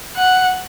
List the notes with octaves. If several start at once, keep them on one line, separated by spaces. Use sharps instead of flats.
F#5